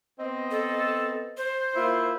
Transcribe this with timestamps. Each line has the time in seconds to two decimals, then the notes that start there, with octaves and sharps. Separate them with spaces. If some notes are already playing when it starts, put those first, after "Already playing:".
0.19 B3 C4 D#5
0.51 A4
1.37 C5
1.76 A#3 E4 F4